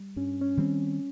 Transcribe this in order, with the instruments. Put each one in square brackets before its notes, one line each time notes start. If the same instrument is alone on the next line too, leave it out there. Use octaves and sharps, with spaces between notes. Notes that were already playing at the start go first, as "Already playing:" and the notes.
Already playing: [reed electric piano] G3
[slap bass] G2 [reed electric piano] C#4
[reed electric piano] C#4
[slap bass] D#3 G3 C4